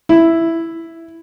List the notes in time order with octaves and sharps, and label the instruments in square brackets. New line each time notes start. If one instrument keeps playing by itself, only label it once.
[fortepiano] E4